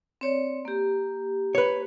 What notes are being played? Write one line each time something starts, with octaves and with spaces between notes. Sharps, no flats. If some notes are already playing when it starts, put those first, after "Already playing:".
C4 C#5 D5
A#3 G4
B4 C#5